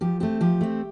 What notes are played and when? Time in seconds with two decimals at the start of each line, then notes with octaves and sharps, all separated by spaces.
0.01 F3 G4
0.20 A3 C4 G4
0.41 F3 G4
0.61 A3 C4